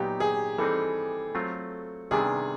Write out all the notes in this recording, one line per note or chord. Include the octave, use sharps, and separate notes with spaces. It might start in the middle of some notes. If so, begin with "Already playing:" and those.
Already playing: A#2 F#3 B3 D#4 G4
G#4
E3 G3 C4 D#4 A4
F#3 A3 C4 F4
C3 D#3 G3 B3 D4 G#4